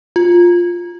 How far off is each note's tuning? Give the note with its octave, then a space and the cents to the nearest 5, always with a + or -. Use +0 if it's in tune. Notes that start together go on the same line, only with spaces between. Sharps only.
F4 +5